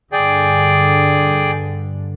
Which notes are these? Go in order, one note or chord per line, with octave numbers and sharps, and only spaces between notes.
G2 D3 G#4 D5 G5